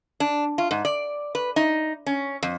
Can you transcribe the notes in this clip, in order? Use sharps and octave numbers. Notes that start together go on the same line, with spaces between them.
D4
F4
G#2
D5
B4
D#4
C#4
F2